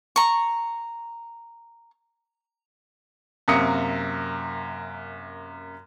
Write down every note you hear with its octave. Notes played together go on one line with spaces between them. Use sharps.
A#5 C#6
F#2 C3 A#3 D#6 C#7